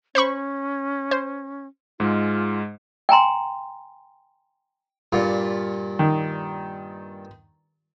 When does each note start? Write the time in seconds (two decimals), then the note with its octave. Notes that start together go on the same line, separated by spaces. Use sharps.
0.15 C#4 C5 B5 C#6
1.11 C5
2.00 G#2 G#3 F4
3.09 G5 G#5 A#5 C6
5.12 G2 A#2 F4
5.99 D#3